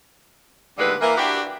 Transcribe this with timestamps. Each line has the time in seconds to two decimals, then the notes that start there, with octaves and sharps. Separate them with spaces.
0.78 D#2 A2 D3 G3 G#3 B4
1.01 E3 A#3
1.17 D4 E4 F#4 G4